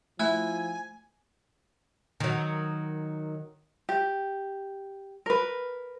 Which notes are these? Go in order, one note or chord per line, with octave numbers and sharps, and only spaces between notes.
F3 A3 E4 E5 G#5
D#3 F#3
G4
A#4 B4